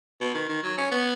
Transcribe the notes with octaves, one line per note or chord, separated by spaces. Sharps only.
B2
D#3
D#3
F#3
C#4
B3